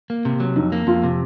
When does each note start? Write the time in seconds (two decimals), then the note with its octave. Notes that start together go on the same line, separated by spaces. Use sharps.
0.10 A#3
0.25 C3
0.40 F#3
0.56 F2 D#4
0.72 A#3
0.87 F2 F4
1.04 C3